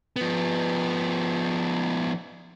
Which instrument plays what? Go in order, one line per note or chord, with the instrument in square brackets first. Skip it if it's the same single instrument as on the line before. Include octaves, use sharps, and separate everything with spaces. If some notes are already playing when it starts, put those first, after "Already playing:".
[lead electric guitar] F3 B3